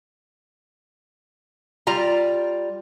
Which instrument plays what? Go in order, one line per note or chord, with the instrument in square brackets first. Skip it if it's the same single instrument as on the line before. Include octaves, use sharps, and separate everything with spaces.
[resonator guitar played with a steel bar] G3 F4 A#5